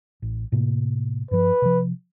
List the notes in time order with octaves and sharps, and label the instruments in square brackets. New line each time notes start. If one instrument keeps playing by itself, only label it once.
[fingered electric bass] A1
A2 C3 A#3
[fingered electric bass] G2 F3 [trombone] B4
[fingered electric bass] C3 F3